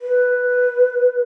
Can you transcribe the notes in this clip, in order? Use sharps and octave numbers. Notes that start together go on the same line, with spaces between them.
B4